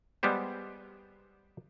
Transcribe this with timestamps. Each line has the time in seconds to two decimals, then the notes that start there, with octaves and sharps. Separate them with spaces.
0.23 G3 G#3 B3 G4 C5